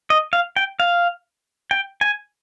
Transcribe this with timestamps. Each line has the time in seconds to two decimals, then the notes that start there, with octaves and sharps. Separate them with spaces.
0.10 D#5
0.33 F5
0.56 G5
0.80 F5
1.71 G5
2.01 G#5